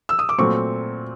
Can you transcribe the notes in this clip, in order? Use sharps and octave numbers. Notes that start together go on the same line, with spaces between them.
E6
D#6
D6
A#2 F#3 A3 C4 C#6